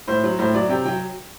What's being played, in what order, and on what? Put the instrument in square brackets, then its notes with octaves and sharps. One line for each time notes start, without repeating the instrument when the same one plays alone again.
[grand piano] A2 C5
F#3
A2 C5
F#3 D5
C3 G5
F#3 G5